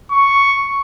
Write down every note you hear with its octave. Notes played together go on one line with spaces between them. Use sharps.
C#6